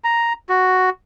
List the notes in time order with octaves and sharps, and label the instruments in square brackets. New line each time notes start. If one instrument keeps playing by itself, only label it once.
[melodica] A#5
F#4